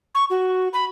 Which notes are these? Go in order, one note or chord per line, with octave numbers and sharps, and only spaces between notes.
C#6
F#4
B5